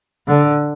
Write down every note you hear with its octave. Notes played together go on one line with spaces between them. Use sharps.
D3